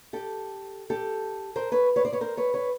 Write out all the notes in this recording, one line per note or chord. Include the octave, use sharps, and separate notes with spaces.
G4 A4
G4 A4
A#4 C5
B4 C#5
B4 C#5
C5 D5
B4 C#5
A#4 C5
B4 C#5
B4 C#5